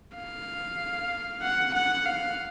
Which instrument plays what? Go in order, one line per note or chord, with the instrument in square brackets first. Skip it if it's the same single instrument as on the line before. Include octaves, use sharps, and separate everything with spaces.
[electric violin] F5
F#5
F#5
F5